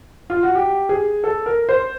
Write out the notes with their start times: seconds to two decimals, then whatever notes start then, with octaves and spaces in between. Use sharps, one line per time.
0.30 F4
0.43 F#4
0.55 G4
0.89 G#4
1.24 A4
1.46 A#4
1.69 C5